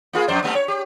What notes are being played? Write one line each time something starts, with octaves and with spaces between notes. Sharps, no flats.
A#3 F4 G#4
F2 C5 D5
G3 A3 B3
C#5
G4